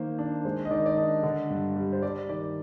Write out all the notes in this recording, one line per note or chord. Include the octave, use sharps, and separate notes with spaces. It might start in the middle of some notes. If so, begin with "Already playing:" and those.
Already playing: D#3 A#3 C5
D4
G#3 C5
D#5
D#3 D5
D5
D4 D#5
D3
G2
G3
C5
G3 D5
D#3 D5